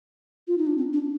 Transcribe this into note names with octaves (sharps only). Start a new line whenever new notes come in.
F4
D#4
D4
C4
D4